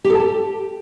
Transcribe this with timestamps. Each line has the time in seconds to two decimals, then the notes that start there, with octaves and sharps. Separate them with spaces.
0.04 G4
0.10 A4
0.15 A5
0.20 G4